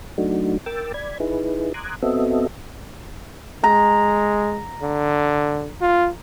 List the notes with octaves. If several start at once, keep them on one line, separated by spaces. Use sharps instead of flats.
F#3 A3 D4 D#4 F#4
A#4 G5 D6 E6 A6
D5 B5 G#6
D#4 E4 G#4 B4
A#5 C6 D6 D#6 F#6 G#6
B3 C4 F#4 A4 D#5 E5
G#3 A#5
D3
F4